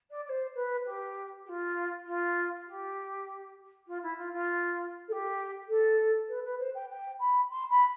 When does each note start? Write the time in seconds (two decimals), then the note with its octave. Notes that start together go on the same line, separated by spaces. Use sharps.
0.10 D5
0.25 D5
0.29 C5
0.55 B4
0.85 G4
1.45 G4
1.48 F4
2.06 F4
2.66 G4
3.87 F4
4.02 E4
4.17 F4
4.32 F4
5.08 A4
5.12 G4
5.68 A4
6.28 B4
6.44 B4
6.59 C5
6.74 G5
6.89 G5
7.19 B5
7.49 C6
7.70 B5